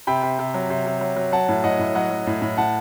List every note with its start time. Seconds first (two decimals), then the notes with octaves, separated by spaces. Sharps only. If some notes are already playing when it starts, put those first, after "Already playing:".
0.07 C3 G5 B5
0.23 C3
0.39 C3
0.54 F#3
0.70 C3
0.86 C3
1.01 F#3
1.17 F#3
1.32 F#3 F#5 A5
1.49 A2
1.64 A2 D#5 F#5
1.79 A2
1.95 F#3 D#5 F#5
2.11 F#3
2.27 A2
2.42 A2
2.58 A2 F#5 A5